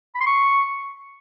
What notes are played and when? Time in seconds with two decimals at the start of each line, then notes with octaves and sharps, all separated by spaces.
0.15 B5
0.21 C6
0.26 C#6